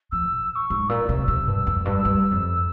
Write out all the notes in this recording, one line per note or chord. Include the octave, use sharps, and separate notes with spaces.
F3 E6
A#2
E6
C#6
G#2
A#2 E6
C3
C3 E6
G2
F2
G2
G2
F2